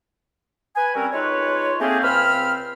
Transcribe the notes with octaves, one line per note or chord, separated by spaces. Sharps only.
B4 G#5
G3 C4 C#4 E4 F#4 A#4
G#3 D#4 F4 B4 C#5
A3 A#3 C4 C#4 G4 G#4
C#2 C4 C5 B5 F6